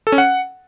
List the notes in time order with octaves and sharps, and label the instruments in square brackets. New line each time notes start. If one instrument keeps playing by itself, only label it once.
[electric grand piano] A4
C#4
F#5